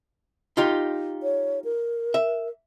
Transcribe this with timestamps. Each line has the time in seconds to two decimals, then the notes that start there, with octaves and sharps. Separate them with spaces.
0.57 D#4 F4 G4
1.23 C#5
1.65 A#4
2.14 E5